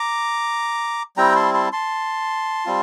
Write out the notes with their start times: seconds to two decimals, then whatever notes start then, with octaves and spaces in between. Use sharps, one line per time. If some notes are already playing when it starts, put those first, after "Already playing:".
Already playing: A#5 D6
1.17 G3 C4 E4 G5 A#5
1.36 A5 C6
1.54 A5 C6
1.72 A5 C6
2.65 G3 C4 F4